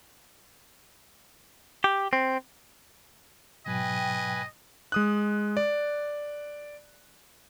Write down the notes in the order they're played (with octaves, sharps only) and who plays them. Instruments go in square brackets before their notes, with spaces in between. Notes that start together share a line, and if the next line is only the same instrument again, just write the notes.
[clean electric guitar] G4
C4
[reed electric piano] G#2 B2 F#3 [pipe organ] B4 G#5 [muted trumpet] D#5 [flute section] G5
[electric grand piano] G#3 D#6 F#6
D5